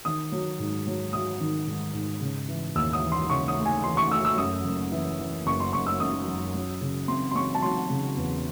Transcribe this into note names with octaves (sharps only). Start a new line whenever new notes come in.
D#3 D#6
F#3
G#2
F#3
F#3 D#6
D#3
G#2
G#2
C#3
E3
D#2 E6
D#6
E3
C6
C#3 C#6
D#6
A3
G#5
E3 C6
C#6
A3 E6
E6
F#2 D#6
F#1
E3
E3
F#1 C#6
C6
F#1 C#6
E6
F#2 D#6
F#2
F#3
C#3
C4 C6
C6
C4 C#6
A5
F#3 C6
C#3
E2